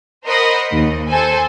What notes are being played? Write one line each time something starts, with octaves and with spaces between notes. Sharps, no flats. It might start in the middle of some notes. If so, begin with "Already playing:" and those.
A#4 C5 D#5 F#5 B5 D#6
D#2
A4 C5 G#5